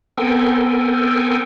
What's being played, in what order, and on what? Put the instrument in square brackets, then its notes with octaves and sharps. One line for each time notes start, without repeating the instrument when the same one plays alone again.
[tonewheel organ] B3 C4 A4 A#4 G5 G#5